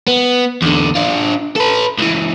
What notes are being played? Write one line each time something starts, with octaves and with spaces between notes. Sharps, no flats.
B3
E2 D3
D4 F4
A4 B4
C#2 E3